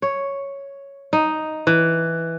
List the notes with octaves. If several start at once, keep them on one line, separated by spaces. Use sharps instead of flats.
C#5
D#4
E3